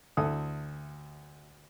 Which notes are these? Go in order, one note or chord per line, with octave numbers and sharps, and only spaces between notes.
D2 E4 A4 D#6